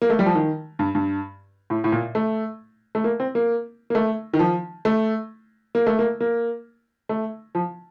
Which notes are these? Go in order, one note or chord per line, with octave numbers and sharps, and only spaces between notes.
A#3
A3
G3
F3
D#3
G2
G2
A2
A2
A#2
A3
A3
A#3
C4
A#3
A#3
A3
D#3
F3
A3
A#3
A3
A#3
A#3
A3
F3